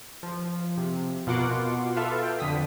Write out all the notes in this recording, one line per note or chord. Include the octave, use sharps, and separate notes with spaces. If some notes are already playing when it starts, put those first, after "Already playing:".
F3
C3
B2 F4 A#4 F#5 C6 D6
F4 A4 B4 E5 F5
G5
F2 D3 D#6 B6